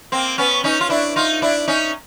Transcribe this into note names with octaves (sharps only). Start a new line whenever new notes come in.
A#3 C4
B3 C#4
C#4 D#4
F4
D4 E4
D#4 F4
D4 E4
C#4 D#4